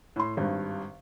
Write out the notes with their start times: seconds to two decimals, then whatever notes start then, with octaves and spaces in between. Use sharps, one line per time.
0.16 A2 C6
0.37 G#1 G2